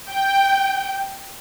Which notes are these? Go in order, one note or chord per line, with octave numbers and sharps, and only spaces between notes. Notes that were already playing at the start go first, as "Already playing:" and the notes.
G5